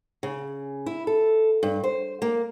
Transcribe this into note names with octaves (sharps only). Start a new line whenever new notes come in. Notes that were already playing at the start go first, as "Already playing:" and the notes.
C#3
E4
A4
G2
C5
A#3